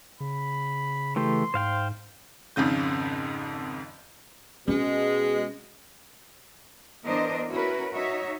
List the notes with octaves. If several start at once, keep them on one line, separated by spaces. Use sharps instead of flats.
C#3 B5
E3 A3 G4 C6
G#2 C5 F5 G5
G#1 F2 G#2 C#3 G6
B2 G#3 C#4
E3 B3 D4 A#4 C5 D#5
C#4 E4 F#4 A#4 B4
D#4 F#4 C#5 E5